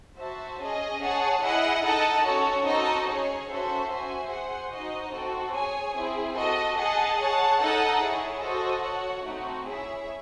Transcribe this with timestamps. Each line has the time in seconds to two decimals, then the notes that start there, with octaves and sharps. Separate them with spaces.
0.18 F#4 C5 E5 A5
0.59 C#4 G#4 D#5
1.01 G#4 C#5 F#5 A5
1.42 E4 G#4 D#5 F#5
1.82 D#4 A4 D#5 F#5 A5
2.24 C#4 F#4 A4 C#5
2.65 C4 D#4 F#4 A4 D#5
3.06 C#4 G#4 C#5
3.47 C#4 F#4 A4 C5 E5
3.89 F#4 C5 E5 G#5
4.30 G#4 C5 F#5
4.71 D#4 F#4 C5 D#5
5.12 C4 F#4 A4
5.53 G#4 C#5 G#5
5.95 C4 E4 G#4
6.36 F#4 A4 D#5
6.77 G#4 D#5 F#5 A5
7.18 G#4 C#5 F#5 A5
7.60 D#4 A4 D#5 F#5 A5
8.01 E4 G#4 C#5
8.42 F#4 A4 C5 D#5
8.83 F#4 C#5 F#5
9.24 A3 C4 D#4 F#4
9.66 E4 G#4 C#5 E5